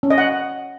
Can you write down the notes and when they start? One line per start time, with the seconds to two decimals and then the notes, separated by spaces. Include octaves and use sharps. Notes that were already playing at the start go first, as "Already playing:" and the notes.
0.03 C#4
0.10 D#5
0.18 F#5